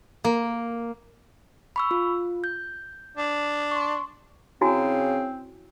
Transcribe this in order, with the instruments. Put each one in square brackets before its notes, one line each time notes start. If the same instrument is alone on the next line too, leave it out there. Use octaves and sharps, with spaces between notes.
[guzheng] A#3
[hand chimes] B5 C#6 E6
F4
G6
[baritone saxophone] D4
[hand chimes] C6 C#6
[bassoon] C#3 [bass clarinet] C4 [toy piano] E4 F#4 G#5